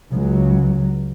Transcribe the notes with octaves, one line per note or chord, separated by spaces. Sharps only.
C#2 F#3